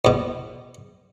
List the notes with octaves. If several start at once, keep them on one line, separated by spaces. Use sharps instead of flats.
E2 B2